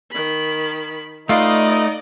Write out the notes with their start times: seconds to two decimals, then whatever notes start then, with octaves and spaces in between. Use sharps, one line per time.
0.11 D#3 B5
1.29 A3 D#4 F4 B4 D5 D#5 F5